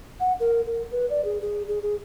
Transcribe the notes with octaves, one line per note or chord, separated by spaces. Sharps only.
F#5
A#4
A#4
B4
D5
G#4
G#4
G#4
G#4